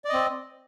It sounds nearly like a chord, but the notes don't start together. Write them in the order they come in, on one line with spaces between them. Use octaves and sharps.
D5 D#5 C4